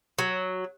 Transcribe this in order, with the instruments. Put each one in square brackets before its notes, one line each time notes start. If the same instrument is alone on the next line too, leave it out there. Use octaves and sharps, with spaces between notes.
[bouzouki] F#3